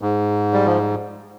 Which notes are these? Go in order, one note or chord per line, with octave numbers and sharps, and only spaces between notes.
G#2
G3
F3